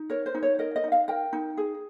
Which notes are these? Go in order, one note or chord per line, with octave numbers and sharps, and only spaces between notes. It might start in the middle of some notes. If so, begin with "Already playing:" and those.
Already playing: D#4
A#4 C#5
C5
D#4
C#5
A#4 D#5
D#5
D#4
F5
A#4 G5
D#4
G#4